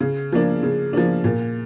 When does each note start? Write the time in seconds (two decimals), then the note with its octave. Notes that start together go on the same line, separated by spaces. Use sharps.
0.01 C#3
0.32 F3 A#3 D4
0.63 C#3
0.93 F3 A#3 D4
1.24 A#2